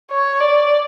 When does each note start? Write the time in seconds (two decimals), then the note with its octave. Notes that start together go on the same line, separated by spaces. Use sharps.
0.11 C#5
0.40 D5